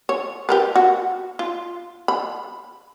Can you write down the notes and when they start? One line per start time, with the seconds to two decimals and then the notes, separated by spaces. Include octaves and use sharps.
0.09 C#5
0.49 G4 A#4 B4
0.76 F#4
1.39 F4
2.08 B5